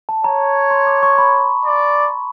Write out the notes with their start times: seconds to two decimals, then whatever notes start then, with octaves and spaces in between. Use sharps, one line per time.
0.09 A5
0.24 C#5 A#5
0.71 C6
0.87 D6
1.03 C#6
1.18 B5
1.65 D5